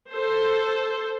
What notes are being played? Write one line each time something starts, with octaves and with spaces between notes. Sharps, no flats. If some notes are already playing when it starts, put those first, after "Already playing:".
A4 C5